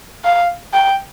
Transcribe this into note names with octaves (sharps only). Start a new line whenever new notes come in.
F5
G5